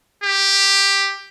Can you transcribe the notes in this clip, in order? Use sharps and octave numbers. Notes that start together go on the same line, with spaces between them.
G4